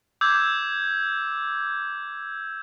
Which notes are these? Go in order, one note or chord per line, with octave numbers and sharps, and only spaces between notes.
D6 E6 G6 G#6